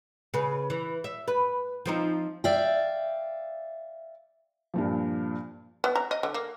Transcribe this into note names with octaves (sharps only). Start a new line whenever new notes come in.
C#3 B4
E3
E5
B4
F3 C4 D#4
D5 E5 F5 G5
G2 A#2 F3
B3
A#5
D#5
D3
A#3